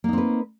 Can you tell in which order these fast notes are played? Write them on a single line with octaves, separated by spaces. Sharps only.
A#3 D#4 C4 B4